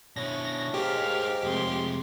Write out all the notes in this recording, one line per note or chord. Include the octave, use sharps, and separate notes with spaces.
B2 C#4 D4 E4 C#5 A#6
D#2 G#2 G4 G#4 C5 F5
F2 C3 G#3 C6